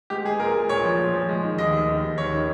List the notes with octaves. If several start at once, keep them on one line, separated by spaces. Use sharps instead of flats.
G#3 G4
G#3 G#4
A#2 A#4
G#3
A#2 C#5
F3
A#2
F3
G#3
D#3
D#2 D#5
D#2
D#3
D#2
D#2 C#5
D#3